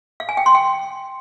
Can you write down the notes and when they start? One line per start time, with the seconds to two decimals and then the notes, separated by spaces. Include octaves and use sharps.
0.20 F5
0.29 G#5
0.37 G5
0.46 C6
0.55 G5